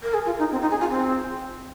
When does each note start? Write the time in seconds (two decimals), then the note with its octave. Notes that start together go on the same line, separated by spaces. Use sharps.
0.03 A#4
0.14 G#4
0.26 F4
0.39 D#4
0.52 C4
0.61 D#4
0.71 G#4
0.80 F4
0.90 C4